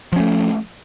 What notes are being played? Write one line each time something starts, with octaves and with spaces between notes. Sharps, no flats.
F3 A3 C#4